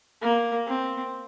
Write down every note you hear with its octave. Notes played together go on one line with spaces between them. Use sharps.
A#3
C4